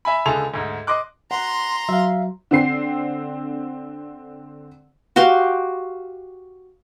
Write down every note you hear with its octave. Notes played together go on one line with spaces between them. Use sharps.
E5 G#5 B5
C#2 D3 G#4 A5 F7
D2 G#2
D#5 C6 D6 F#6
F#5 A#5 C6
F#3 E5 F5
D3 C4 C7
F#4 G4 F5 C6